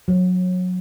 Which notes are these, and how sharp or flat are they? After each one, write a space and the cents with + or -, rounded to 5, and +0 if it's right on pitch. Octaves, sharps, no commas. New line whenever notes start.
F#3 -25